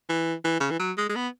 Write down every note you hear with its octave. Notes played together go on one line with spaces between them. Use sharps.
E3
E3
C#3
E3
F#3
G#3
G#3
B3